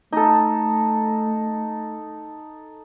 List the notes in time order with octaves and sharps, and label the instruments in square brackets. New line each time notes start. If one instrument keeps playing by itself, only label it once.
[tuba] A3 [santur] D#4 A4